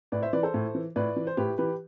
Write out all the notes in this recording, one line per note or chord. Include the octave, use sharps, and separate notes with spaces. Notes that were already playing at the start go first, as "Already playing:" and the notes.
A2 B4 D5
C5 E5
E3 B4 D5
A4 C5
A2
E3
A2 B4 D5
E3
C5
A2 G4 B4
E3 G4 B4